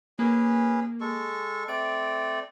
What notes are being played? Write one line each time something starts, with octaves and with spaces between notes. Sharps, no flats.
A#3 C#4 G#4 B4
G#3 A4 C#6
A3 C4 D5 D7